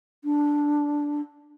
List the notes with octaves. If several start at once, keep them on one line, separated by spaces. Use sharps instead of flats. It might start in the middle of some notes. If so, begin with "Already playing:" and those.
D4